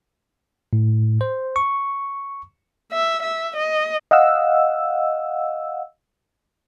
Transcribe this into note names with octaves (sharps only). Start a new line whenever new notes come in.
A2
C5
C#6
E5
E5
D#5
D#5 F5 F#5 E6